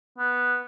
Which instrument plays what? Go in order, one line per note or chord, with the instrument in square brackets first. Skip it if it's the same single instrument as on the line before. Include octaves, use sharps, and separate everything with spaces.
[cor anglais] B3